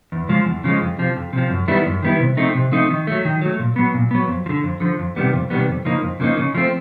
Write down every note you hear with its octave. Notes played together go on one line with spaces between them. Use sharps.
E2
C#3 F3 G#3
E2
C#3 F3 G#3
F2
C3 F3
F2
C3 F3
F#2
D#3 G3 B3 E4
F#2
D#3 G3 B3 E4
C3
F3 A3 C4 D#4
C3
F3 A3 C4 D#4
D#3
F#3 A3
D#3
F#3 A3
A#2
F#3 B3
A#2
F#3 B3
F2
F3
D3
F2
D3 F3
F2
C3 D#3 G3 B3
F2
C3 D#3 G3 B3
F2
C#3 F3 A#3 D#4
F2
C#3 F3 A#3 D#4
C#3
F3 A3 C4